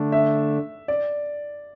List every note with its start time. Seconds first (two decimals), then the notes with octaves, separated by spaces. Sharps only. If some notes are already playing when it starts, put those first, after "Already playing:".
Already playing: D3 A3 D4
0.12 E5
0.88 D5